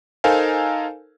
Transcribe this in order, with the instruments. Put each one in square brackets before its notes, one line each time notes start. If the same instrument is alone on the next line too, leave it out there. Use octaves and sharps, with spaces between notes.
[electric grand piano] D#4 A4 A#4 C5 F5 G#5